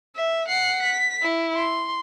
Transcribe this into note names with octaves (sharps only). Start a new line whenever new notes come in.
E5
F#5 C7
B6
E4
C6